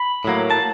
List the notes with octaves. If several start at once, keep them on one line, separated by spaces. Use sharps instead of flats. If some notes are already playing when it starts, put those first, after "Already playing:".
Already playing: B5
A2 F#3 A#3
A5